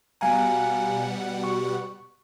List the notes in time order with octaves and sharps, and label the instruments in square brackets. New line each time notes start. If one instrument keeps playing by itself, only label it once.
[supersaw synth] B2 G3 F#5 [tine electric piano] F5 G#5 A#5
[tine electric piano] C#6